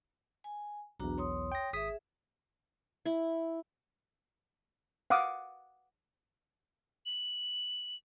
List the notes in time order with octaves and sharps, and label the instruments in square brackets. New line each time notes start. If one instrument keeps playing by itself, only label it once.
[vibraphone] G#5
[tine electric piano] B1 E2 [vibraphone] D4 F#4 A#5
[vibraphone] C#5 C6 D#6
[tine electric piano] G5 A#6
[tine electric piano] G#1 D#6 B6 [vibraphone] G#4 E5
[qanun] E4
[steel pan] F5 F#5 D6 D#6
[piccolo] F#7